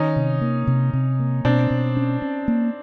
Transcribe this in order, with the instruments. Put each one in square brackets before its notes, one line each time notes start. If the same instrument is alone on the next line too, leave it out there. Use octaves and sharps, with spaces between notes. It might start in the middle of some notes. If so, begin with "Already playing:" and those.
Already playing: [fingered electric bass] D#3 [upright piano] C#4 D#4
[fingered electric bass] C3
A#3
C3
C3
A#3
[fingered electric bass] B2 [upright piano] C4 D4
[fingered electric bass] B2
C#4
C#4
A#3